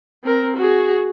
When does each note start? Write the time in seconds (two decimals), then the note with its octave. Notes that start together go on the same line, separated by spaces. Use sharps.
0.24 C4 A#4
0.57 F#4 G#4